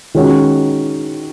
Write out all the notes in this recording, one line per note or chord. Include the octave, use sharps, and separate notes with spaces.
D#3 G#3 C#4 F#4